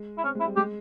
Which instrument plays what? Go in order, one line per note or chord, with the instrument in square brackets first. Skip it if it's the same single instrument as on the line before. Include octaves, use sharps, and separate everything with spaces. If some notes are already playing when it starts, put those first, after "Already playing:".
Already playing: [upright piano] G#3
[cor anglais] E4
[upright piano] C4 [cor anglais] C#4
[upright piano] G#3
[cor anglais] E4
[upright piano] G3
[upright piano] G#3 [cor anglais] G4